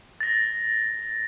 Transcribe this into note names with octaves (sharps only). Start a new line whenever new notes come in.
A6 A#6